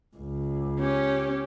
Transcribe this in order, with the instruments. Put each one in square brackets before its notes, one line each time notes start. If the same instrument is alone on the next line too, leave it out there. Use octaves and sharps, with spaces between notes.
[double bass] C#2
[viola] C#4 G4